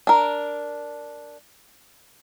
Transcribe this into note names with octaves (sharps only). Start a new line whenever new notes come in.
D4 A#4